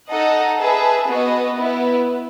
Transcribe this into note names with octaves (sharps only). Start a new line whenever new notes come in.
D#4 A4 D#5 F#5
G#4 B4 E5 A5
B3 F#4 B4 D#5
B3 E4 B4